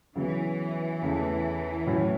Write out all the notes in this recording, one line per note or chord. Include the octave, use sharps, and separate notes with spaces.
C#3 E3 F#3 B3
E2 C#3 A3
A2 F#3 C#4 E4